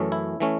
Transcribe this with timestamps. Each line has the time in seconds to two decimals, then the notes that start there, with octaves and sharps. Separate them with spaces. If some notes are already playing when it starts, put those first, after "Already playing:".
Already playing: F#2 E3 A3 C#4
0.12 E4
0.40 E3 A3 C#4